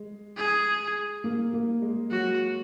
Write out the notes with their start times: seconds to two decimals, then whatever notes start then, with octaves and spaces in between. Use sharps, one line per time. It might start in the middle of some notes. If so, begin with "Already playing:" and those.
Already playing: G#3
0.37 G#4
1.24 A#3
1.54 A#3
1.82 G#3
2.11 F#3 F#4